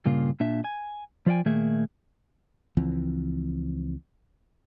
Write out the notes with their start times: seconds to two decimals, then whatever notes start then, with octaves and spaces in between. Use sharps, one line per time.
0.06 G2 A#2 C#3 A#3 F4
0.40 A#2 D4 E5
0.64 G#5
1.26 F3 F4 D5 E5 G5 G#5
1.45 A#2 D#3 A3 A#3 G#4 E5
2.77 C#2 E3 F3 C4